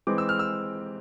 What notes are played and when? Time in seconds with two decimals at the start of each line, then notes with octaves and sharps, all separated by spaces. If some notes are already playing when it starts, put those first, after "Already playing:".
0.07 E3 G#3 C4 D6
0.18 E6
0.29 F6
0.39 E6